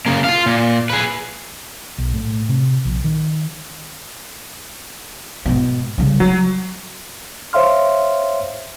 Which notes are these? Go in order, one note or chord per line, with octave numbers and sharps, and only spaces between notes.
C#3 A#3
F4 F5
A#2
G#4 B4
B1
A2
C3
A#1
D#3
G#2 B2
C#3 G3
F#3 F4
C5 C#5 E5 F5 C6 F6